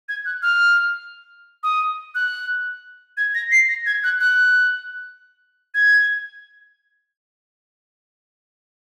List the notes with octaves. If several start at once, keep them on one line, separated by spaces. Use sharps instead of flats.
G#6
F#6
F6
D#6
F#6
G#6
A#6
C7
A#6
G#6
F#6
F#6
G#6